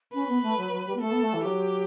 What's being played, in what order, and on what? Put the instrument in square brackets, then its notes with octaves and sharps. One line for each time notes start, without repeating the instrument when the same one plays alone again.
[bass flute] C#4 [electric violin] B4
[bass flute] B3
A3
F#3
F#3
G3
B3
[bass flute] A3 [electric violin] A4
[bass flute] B3
A3
E3
[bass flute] F#3 [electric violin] G4